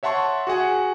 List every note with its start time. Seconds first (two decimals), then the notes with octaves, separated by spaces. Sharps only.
0.03 C#5 E5 F#5 A5 C6 C#6
0.47 F#4 G#4 F#5 G#5